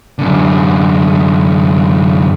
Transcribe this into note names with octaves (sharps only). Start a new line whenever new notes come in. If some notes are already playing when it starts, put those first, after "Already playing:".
F#2 D3